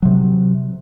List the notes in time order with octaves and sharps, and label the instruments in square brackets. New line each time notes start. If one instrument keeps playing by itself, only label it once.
[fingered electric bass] C3 F#3